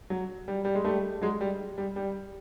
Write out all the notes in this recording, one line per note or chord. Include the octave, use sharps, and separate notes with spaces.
F#3
G3
G3
G#3
G3 A3
F#3 G#3
G3
G3
G3